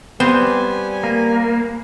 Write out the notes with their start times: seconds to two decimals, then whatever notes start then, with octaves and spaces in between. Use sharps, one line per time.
0.20 G3 B3 C4 C5 G#5
1.04 A#3